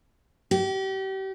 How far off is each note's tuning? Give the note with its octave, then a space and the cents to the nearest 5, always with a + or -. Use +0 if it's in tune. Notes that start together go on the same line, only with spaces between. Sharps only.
G4 -35